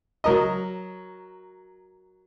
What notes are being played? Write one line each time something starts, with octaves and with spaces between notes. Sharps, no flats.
F#3 A#4 D#5